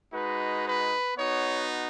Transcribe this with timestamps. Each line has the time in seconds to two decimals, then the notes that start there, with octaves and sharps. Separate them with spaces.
0.13 G#3 D#4 F#4 B4
0.65 B4
1.17 B3 D#4 F#4 C#5